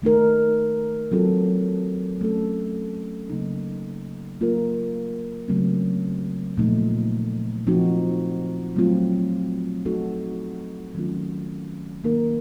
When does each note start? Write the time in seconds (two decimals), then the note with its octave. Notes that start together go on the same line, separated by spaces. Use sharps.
0.02 D#3 A3 D#4 A#4
1.12 F#3 C4 F4 A4
2.21 A3 C#4 A4
3.30 C#3 F#3 A#3 D#4
4.40 F#3 A#3 F4 A#4
5.48 C#3 F#3 A3 C4
6.58 A#2 F3 A3 D#4
7.67 F3 C4 D#4 F#4
8.76 F#3 A3 C4 F4
9.85 A3 C4 D#4 F#4 A4
10.95 D#3 F#3 A3 C#4 F4
12.04 D#3 A#3 D#4 A#4